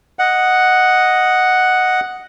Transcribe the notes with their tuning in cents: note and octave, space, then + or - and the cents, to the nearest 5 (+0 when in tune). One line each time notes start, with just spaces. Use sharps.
D#5 +0 F#5 +0